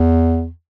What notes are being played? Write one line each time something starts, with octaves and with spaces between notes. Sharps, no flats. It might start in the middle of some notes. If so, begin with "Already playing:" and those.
Already playing: E2